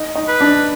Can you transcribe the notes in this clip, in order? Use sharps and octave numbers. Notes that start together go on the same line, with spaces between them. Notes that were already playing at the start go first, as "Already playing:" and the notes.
Already playing: D#4
D#4
B4
D4